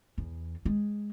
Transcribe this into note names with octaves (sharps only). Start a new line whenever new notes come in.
E2
G#3